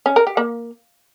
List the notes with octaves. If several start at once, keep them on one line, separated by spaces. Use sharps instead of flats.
C#4
A#4
G4
A#3